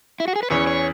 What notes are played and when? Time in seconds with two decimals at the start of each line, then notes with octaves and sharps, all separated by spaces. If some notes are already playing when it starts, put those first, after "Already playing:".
0.20 E4
0.28 F#4
0.36 G#4
0.43 B4
0.50 E2 E3 C#4 C#5
0.67 C#5